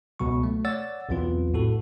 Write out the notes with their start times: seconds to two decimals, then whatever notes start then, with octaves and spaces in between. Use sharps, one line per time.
0.19 C#2 B2 F#3 C#6
0.43 A3
0.65 C#5 D5 F#5 E6 A6
1.09 B1 E2 F#3 C4 F4 B4
1.54 A2 F#4 A4